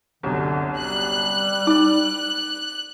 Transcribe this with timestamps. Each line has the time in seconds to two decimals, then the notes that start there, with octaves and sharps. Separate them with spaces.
0.23 G1 C2 F#2 D3
0.79 G3 F#6
1.67 D#4 D5 D6